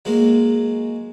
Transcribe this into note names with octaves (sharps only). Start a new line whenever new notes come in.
F#3 G#3 A#3